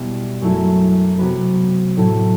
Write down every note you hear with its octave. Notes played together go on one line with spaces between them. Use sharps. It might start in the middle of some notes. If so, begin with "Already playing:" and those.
Already playing: B2 G3 B3 E4
F#2 F#3 A3 E4
C3 F#3 B3 F#4 B4
A2 F#3 A3 E4 A4